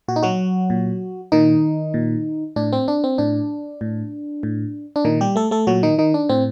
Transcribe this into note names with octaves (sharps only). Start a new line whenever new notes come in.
A#2 F#4
D#4
F#3 F#4
A#2
A#2 D#3 D#4
A#2
A2 D4
C4
D4
C4
A2 D4
A2
A2
D4
A#2 D#3 D#4
G3 G4
A3 A4
A3 A4
A#2 F#3 F#4
D#3 D#4
D#3 D#4
D4
A2 C4